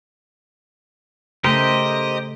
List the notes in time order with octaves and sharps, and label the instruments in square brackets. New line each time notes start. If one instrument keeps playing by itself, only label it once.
[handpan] C#3 A3 A4 [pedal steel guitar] G4 A#4 C5 [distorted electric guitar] D#5